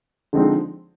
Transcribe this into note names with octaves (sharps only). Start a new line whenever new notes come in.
D3 F3 G#3 C4 D#4